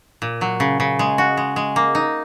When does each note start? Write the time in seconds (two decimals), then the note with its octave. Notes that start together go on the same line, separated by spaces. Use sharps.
0.22 A#2
0.41 F#3
0.60 C#3
0.80 C#3
0.99 G#3
1.18 F#4
1.37 G#3
1.56 G#3
1.76 A#3
1.95 D#4